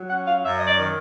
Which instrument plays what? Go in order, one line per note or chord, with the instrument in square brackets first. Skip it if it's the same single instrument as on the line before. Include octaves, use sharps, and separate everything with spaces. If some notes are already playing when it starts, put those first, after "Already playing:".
Already playing: [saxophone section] F#3
C#4 F#5
F5
F#2 E5
D#5
D5
D#3